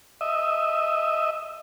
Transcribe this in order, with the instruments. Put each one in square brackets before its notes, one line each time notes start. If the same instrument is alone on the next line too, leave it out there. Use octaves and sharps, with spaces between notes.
[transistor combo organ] D#5 E5